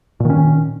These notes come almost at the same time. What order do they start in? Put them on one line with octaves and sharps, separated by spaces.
A#2 D#3 C#4